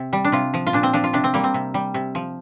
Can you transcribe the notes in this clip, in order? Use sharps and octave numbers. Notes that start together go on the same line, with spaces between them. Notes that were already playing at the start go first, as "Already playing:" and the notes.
Already playing: C3
G3
D4
C3 F4
F3
F4
A#2 D4
C4
F3 D4
F4
C3 D4
C4
G3 A#3
C4
C3
G3
C3
F3